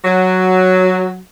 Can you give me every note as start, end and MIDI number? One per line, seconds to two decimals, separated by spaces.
0.05 1.18 54